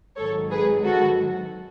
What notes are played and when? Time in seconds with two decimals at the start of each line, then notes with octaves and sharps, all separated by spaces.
0.16 G#1 G#2 D#3 F#3 A4 C#5
0.50 G#4 B4
0.83 F#4 A4